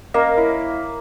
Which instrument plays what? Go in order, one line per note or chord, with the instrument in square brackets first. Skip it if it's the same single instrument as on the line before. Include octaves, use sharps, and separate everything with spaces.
[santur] A#3 [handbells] C#4 A#4 D#5
[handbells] E4 C#5 E5